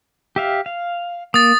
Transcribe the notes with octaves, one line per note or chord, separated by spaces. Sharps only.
G4 E5 F5
F5
A#3 D#6 A6